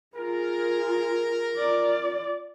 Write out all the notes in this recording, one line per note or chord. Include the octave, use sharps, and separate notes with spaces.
F4 G#4 A#4
F4 D5